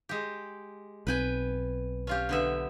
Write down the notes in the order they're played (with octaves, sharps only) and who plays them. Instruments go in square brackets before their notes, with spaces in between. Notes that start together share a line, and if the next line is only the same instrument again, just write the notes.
[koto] G#3 G4
[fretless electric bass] B1 C4 [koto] B4 G5 G#5
[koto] C#4 F4 G4
D3 B3 E5